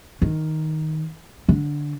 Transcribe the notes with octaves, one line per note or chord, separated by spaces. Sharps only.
D#3
D3